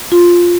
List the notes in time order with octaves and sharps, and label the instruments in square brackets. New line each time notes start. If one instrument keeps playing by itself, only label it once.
[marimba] F4